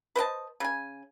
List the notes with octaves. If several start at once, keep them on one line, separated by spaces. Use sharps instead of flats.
B4 C5 D#5 A5
C#3 G#5